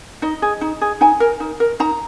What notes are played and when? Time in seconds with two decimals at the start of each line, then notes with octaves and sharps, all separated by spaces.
0.22 D#4 D#5
0.42 G#4
0.61 D#4
0.81 G#4
1.01 D#4 G#5
1.20 A#4
1.40 D#4
1.60 A#4
1.80 D#4 A#5